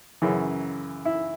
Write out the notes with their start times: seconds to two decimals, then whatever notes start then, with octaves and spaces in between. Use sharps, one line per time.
0.22 F#2 C#3 E3
1.05 E4